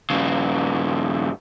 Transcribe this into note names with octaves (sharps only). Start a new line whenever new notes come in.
G2 C#3